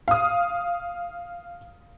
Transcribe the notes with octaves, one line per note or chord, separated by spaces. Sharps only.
F5 D#6